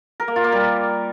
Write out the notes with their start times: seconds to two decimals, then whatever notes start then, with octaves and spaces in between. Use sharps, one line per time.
0.20 A#4
0.28 A#3
0.36 F4
0.44 A#3
0.52 G3